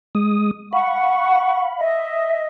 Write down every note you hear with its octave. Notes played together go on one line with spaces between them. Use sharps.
G#3 D#6
F5 F#5 B5 C#6
D#5 E5